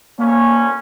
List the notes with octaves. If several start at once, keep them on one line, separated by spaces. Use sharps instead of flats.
D2 A#3 C#4